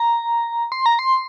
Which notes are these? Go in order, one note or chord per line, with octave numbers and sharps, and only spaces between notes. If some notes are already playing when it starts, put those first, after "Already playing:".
Already playing: A#5
C6
A#5
C6